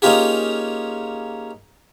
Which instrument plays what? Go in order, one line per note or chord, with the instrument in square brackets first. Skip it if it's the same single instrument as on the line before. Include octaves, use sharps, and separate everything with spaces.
[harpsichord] A#3 C#4 D#4 F4 G4 G#4